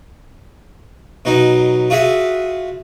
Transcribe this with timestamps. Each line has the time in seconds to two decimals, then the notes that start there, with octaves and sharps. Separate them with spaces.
1.25 B2 F#3 B3 D#4
1.90 F4 F#4 G#4 E5 F5